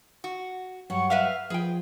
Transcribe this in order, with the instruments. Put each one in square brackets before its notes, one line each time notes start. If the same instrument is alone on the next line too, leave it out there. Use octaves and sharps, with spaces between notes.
[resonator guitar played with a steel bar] F#4
[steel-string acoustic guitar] G2 F#3 F#5 [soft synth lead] C#6
[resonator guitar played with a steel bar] B4 E5 F5 [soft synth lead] F6
[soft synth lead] F3 [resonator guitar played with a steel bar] G#4 G5 [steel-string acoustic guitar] B4